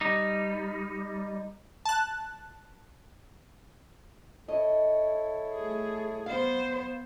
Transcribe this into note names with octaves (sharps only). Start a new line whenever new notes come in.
G3 D#4
A5 F#6
E4 A4 C#5 D#5
A3 G#4
B3 C5 F5